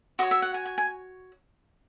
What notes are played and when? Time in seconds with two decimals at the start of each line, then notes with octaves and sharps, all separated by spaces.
0.19 F#4 D#5
0.23 C#5
0.31 E5
0.42 F#5
0.54 G#5
0.65 G#5
0.78 G#5